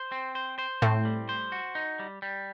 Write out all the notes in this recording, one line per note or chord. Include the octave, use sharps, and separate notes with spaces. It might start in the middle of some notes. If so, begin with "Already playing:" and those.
Already playing: C5
C4
C5
C5
A2 A3 C4
G3
C5
F#4
D#4
G3
G3